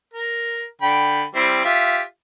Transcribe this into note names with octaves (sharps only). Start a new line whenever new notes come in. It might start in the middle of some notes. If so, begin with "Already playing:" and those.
A#4
D3 G5 B5
G3 C4 E4
F4 G4 E5